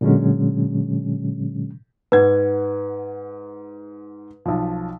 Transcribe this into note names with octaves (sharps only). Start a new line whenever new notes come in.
A#2 D3 F#3 G#3 C#4
G#2 B4 F#5 G#6
B1 F3